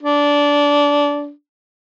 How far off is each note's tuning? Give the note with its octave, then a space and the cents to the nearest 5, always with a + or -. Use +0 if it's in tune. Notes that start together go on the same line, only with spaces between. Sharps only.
D4 -20